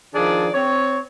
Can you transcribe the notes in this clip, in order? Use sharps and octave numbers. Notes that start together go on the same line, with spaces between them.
D#3 F3 D4 G#4 D5
C4 C#5